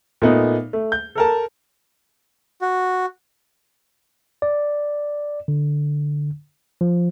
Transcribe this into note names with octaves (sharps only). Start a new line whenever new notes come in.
A#2 A3 B3 D#4
A3
G6
A4 A#4 A5
F#4
D5
D3
F3